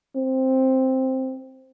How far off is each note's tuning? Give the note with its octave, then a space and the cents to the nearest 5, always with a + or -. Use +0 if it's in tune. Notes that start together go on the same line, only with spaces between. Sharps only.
C4 +5